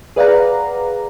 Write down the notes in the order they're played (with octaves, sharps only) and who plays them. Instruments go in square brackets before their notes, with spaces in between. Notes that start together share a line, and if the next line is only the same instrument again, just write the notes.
[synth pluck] G#4 B4 D5 F5 F#5 A#5